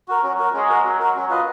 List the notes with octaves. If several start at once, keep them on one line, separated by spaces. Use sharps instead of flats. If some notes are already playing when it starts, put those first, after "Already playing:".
F#4 A#4
F#3 C#4
F#4 A#4
G#3 C#4
F#4 A#4
F#3 C#4
F#4 A#4
F#3 C#4
F4 B4 D#5